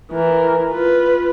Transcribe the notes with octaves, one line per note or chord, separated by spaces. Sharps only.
E3 A#4
F4 B4